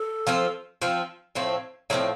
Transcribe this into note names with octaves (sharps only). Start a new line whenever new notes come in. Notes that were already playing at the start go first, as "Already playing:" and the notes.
Already playing: A4
F3 C4 F4
F3 C4 F4
A2 F3 A3 C4
A2 F3 A3 C4